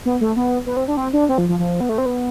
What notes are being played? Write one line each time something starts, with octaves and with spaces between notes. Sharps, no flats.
B3
A3
B3
B3
C4
D4
C4
D4
C4
F3
F3
F3
B3
A3
C4
B3